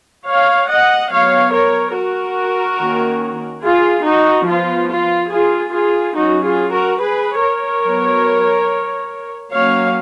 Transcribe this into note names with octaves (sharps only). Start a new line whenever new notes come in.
C#5 F5
D#5 F#5
F#3 B3 C#5 F5
A#4 C#5
F#4 A#4
D#3 A#3 C#4
F4 G#4
D#4 F#4
F3 B3 F4
F4
F4 G#4
F4 G#4
F#3 C#4 D#4 F#4
F4 G#4
F#4 A#4
G#4 B4
A#4 C#5
F#3 B3
F#3 A#3 C#4 C#5 F5